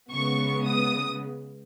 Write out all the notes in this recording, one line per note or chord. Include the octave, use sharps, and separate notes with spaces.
C#3 G#3 B3 C#6
D#6